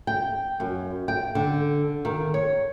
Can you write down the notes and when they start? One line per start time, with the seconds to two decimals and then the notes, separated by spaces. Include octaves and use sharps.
0.07 G5
0.60 F#2
1.08 G5
1.35 D3
2.05 D#3
2.34 C#5